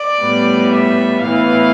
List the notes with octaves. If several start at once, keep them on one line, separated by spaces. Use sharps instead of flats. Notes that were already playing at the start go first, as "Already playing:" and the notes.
Already playing: D5
A2 G3 B3
E5
A2 E3 B3 F5